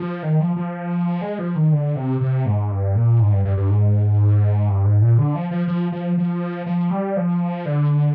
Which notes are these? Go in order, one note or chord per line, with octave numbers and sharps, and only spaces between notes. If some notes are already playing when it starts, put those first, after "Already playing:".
Already playing: F3
D#3
F3
F3
G#3
F3
D#3
D3
C3
C3
G#2
G2
A#2
G#2
G2
G2
G2
G#2
G2
G#2
A#2
D3
F3
F3
F3
F3
F3
F3
G3
F3
D3